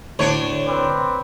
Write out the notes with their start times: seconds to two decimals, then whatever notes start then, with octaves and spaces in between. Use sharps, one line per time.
0.19 D2 A2 D4 C#5
0.67 C4 B4 D6